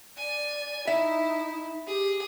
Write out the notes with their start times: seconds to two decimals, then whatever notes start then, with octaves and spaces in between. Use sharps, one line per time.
0.17 D5 G#5
0.87 D#4 E4 E5
1.87 G4 G#4